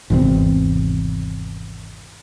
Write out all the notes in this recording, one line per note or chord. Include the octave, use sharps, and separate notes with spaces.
G#1 E2 C3